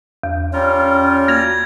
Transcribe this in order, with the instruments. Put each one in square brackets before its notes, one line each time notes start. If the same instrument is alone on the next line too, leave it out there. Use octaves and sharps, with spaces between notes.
[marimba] E2
[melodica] G3 F4 A#4 [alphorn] C#4
[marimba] A#3 F#4 [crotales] G#6 A#6